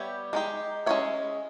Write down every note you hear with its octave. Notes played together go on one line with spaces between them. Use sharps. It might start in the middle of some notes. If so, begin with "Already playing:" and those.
Already playing: G3 B3 G4 C#5 E5
G#3 D#4 G4
G#3 C#4 G#4 C#5 E5